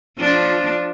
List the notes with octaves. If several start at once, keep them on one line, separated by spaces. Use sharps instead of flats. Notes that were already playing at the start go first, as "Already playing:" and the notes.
F3 D4